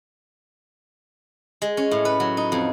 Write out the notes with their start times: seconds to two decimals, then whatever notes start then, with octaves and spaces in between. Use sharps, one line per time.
1.62 G#3
1.77 C#4
1.91 A2
2.05 B4
2.20 F#3
2.37 D#4
2.52 F2